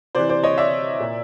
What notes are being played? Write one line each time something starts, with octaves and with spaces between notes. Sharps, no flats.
C3 E3 C5 D5
C5 D5
C#5 D#5
D5 E5
A#2